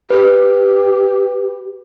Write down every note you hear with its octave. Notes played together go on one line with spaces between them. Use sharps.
G4 B4